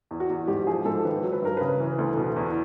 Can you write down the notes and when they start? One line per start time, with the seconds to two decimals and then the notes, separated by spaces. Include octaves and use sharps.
0.11 E2
0.20 F#4
0.30 E2
0.48 G#2 G4
0.67 F3 G#4
0.85 G#2 A4
1.05 D#3 B4
1.23 F#3
1.33 B4
1.42 G2 A#4
1.57 C#3 B4
1.80 E3
1.98 D2
2.17 B2
2.36 E2